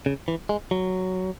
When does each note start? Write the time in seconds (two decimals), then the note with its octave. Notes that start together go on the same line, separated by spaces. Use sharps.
0.06 C#3
0.28 E3
0.49 G#3
0.71 F#3